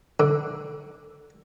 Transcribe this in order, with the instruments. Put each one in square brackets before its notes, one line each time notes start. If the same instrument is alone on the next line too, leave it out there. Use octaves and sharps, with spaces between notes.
[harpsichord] D3